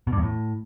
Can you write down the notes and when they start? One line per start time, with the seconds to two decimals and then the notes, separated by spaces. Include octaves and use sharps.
0.07 B2
0.12 G2
0.18 E2
0.23 A2